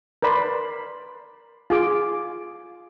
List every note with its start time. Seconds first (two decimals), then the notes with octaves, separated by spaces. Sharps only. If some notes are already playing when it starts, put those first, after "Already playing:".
0.23 A#4 B4 D5 B5 C6
1.70 F4 G#4 D6